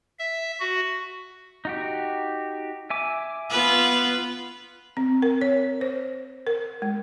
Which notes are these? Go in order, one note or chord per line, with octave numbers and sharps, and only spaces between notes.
E5
F#4
D#4 F#4 G4
E5 G#5 D6
B3 F4 B4
C4
A#4
C#5
C5
A#4
G#3